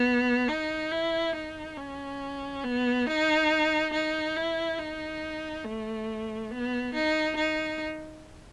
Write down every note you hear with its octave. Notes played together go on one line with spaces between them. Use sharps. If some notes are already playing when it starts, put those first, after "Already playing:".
Already playing: B3
D#4
E4
D#4
C#4
B3
D#4
D#4
E4
D#4
A3
B3
D#4
D#4